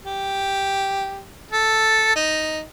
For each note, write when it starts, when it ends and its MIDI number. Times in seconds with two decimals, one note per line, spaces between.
0.05 1.25 67
1.51 2.12 69
2.15 2.61 63